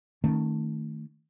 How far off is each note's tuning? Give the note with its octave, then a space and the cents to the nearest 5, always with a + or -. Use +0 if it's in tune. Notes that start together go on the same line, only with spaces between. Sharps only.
D#3 +0 A3 +10 C#4 -40